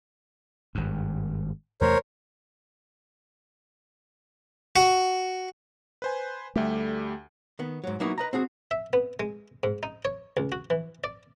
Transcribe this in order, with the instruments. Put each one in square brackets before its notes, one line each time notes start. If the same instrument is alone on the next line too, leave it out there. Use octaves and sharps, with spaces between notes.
[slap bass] G#1 G2
[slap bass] E2 C3 A3 [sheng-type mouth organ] A#4 C5 C#5
[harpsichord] F#4
[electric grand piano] B4 C5 G#5
[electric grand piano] D2 G3 G4 [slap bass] A3
[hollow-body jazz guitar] D#3 B3
G#2 F#3
F#3 A#3 B3 D#4 E4 F#4
B4 D#5 A#5
C4 F#4 G#4
[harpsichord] E5
B3
G#3
G#2
D#4
C#5
C#2
F#4
E3
D5